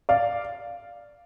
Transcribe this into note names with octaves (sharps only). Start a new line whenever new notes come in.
D5 F5